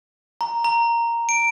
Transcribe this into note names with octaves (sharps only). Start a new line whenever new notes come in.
A#5
A#5
D7